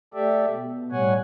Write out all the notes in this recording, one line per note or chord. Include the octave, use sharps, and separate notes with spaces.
A3 G4 A4 D5 E5
B2
A2 G3 C#5 F#5 G#5